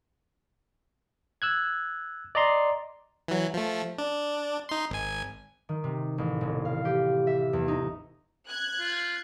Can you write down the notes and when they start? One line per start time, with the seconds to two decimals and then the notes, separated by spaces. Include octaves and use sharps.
1.42 E6 F#6 G#6
2.35 D5 D#5 A#5 C6
3.28 E3 F#3
3.54 F3 A3
3.98 D4
4.69 D#4 C6
4.90 G#1 G#5
5.69 D#3
5.84 C3
6.18 A1
6.41 E1
6.65 F5
6.85 G4
7.27 E5
7.53 E2
7.68 D#4
8.48 F#6 G#6
8.80 F4